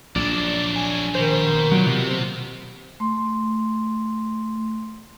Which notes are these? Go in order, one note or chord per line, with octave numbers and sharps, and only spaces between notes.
A#1 F#3 A4 D5
G#5
B2 D#3 C5
A#2 F#3
C3
A3 C6